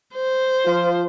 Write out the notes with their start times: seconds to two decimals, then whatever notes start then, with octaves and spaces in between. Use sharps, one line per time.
0.15 C5
0.65 F3 F4